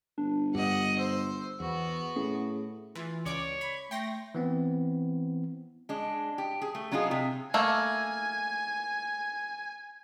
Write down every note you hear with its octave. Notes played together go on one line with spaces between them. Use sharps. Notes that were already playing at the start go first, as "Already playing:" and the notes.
G1 D4
G2 G4 D#5 F#5
C5 E6
E2 B3 F#4
A2 C#4 G#4
E3 F4
C#2 C#5 D5 D6
B5
A3 G5 C6 A#6
E3 B3 C4
G#3 D4
G4
G#4
A3
F#3 D4 D#4 F4 G#4
C3
A3 A#3 G#5